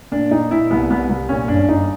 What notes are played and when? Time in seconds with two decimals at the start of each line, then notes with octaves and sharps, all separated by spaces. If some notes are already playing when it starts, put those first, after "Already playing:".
0.12 A#2 D4
0.31 A#2 D#4
0.51 A#2 E4
0.70 C2 B3
0.90 C2 B3
1.09 C2
1.29 A#2 C#4
1.48 G1 D4
1.68 G1 D#4